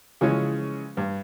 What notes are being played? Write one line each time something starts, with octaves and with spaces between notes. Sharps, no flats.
C#3 E3 F3 G#3 C#4
G2